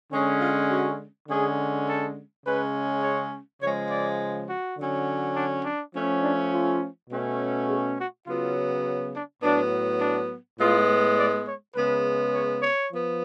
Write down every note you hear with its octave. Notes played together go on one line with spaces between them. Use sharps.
D3 G#3 C#4
F4
F#4
D3 G#3 C#4 G#4
A4
C#3 G#3 C#4 B4
C#5
C#3 F3 G#3 C#5
D5
F#4
D3 F#3 C#4
D4
D4
F3 A3 C#4
D4
F4
B2 A3 C#4
G#4
F#4
C#3 F#3 B3 F4
D4
A2 F#3 B3 D4
D4
A2 G#3 B3 F4
D5
C#5
C#3 G#3 B3 B4
C#5
C#5
F3 B3